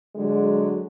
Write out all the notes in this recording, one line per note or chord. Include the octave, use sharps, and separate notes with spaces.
D3 F#3 G#3